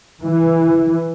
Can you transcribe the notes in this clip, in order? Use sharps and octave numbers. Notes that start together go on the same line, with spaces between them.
E3